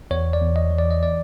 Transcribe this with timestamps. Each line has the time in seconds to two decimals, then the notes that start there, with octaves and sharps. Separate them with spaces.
0.11 E2 C#5
0.33 D5
0.41 E2
0.56 D#5
0.71 E3
0.78 D5
0.90 D#5
1.03 D5